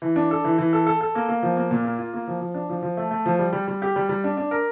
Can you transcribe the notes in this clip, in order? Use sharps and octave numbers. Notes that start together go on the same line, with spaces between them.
E3
D4
A4
E3
E3
A4
A4
A4
A#3
A#3
F3
A#3
A#2
A#3
F4
A#3
F3
F3
D4
F3
F3
A3
A3
F3
G3
G3
G3
G4
G3
G3
D4
D4
A#4